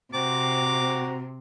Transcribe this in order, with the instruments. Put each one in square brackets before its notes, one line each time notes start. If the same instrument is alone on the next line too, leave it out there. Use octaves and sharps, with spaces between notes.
[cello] C3 [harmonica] C4 F#4 A#5 [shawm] D6